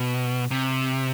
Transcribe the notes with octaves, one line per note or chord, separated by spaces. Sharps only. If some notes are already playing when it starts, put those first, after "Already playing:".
Already playing: B2
C3